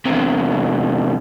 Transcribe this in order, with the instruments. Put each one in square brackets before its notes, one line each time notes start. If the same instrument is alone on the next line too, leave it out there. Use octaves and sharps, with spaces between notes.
[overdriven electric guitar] E2 C3